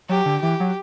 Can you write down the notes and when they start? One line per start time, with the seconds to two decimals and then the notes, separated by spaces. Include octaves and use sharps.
0.09 F#3 G4
0.26 D3
0.43 E3 G4
0.60 F#3